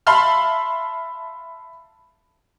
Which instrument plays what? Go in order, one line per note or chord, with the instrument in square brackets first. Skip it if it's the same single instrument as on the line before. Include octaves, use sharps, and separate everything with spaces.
[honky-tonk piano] E5 F5 A5 B5 C6 F6